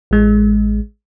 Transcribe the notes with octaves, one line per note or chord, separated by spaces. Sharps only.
A1 G#3